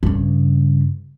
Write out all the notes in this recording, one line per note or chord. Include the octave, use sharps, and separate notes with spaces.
G2 C#3